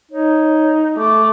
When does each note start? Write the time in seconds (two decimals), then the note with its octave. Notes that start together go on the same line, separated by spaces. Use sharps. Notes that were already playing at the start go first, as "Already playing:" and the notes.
0.11 D#4 C#5
0.97 A3 D6